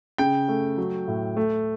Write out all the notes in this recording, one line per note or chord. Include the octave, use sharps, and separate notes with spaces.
C#3 G5
A3
F#3
A2
A3